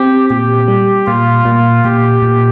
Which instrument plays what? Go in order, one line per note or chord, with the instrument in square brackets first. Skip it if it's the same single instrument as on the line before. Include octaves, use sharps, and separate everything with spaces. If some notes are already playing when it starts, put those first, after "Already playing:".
Already playing: [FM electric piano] C4 [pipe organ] G4
[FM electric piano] A#2 [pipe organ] G4
[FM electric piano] G3
[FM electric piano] A#2 [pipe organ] F4
[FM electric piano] A#2
[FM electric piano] A#2 [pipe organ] G4
[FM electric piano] A#2